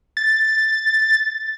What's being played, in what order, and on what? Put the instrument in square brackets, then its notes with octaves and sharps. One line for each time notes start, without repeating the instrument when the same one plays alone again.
[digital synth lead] A6